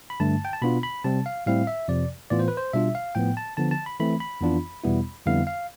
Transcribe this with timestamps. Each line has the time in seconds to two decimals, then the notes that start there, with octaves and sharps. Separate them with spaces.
0.10 B5
0.20 G2 D3 A3 A5
0.45 G5
0.53 A5
0.62 B2 B3 D4 F4 B5
0.83 B5
1.04 C3 G3 C4 A5
1.26 F5
1.46 A2 G3 C4 E4 F5
1.67 E5
1.88 F2 C3 F3 D5
2.30 A2 E3 B3 F4 D5
2.39 C5
2.48 B4
2.57 C5
2.73 B2 G3 D4 F4 E5
2.95 F5
3.15 A2 F3 B3 G5
3.37 A5
3.57 D3 F3 B3 A5
3.71 A5
3.86 B5
3.99 E3 A3 C4 B5
4.20 B5
4.41 F2 E3 B3 D4 F4
4.84 E2 B2 G3 B3 E4
5.26 F2 D3 G3 B3 E4 F5
5.47 F5